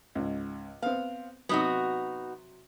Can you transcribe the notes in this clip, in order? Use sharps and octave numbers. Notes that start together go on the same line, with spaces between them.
C#2 G#2
B3 C4 F5
C3 F#3 B3 D#4 F#4